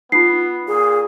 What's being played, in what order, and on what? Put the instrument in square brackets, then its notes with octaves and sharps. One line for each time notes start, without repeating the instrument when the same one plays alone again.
[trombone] B3 [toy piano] D#4 F4 [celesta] C7
[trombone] A#2 [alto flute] G#4